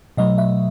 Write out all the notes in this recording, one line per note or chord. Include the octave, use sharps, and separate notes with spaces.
B2 F#3 A3 D#5
E5